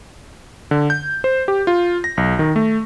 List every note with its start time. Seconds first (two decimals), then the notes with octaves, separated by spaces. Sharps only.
0.71 D3
0.90 G6
1.24 C5
1.48 G4
1.67 F4
2.04 A#6
2.17 B1
2.39 D#3
2.56 A3